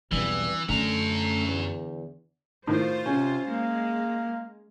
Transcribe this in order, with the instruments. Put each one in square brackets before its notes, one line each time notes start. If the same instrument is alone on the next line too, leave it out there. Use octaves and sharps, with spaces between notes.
[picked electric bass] B1 E2 [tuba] G2 [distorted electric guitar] E3 [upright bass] C4
[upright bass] F#2 [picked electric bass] D3 [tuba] A3 [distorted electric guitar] C#4 A#5
[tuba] E2
[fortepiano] A2 D#3 [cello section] F4 C5
[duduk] C3 [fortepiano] C#4
[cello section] G#3 [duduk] A#3